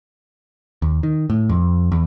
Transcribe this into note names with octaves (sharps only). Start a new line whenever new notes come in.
D#2
D#3
A2
F2
E2